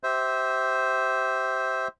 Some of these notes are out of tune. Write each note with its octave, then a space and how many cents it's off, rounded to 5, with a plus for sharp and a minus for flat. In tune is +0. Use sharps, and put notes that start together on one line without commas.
G4 -30 C5 +0 E5 -15